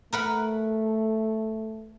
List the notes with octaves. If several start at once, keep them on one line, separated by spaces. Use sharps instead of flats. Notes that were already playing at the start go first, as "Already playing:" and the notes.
A3 A#4 B4 F#5